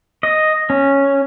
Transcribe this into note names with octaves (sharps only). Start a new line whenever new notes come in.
D#5
C#4